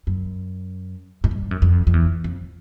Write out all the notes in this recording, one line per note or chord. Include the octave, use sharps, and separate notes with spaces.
F#2
G#2
G2
F#2
F2
F2
E2
F2